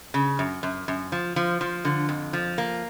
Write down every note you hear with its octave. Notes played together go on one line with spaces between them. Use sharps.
C#3
F#2
F#2
F#2
F3
F3
F3
D3
F2
F3
A#3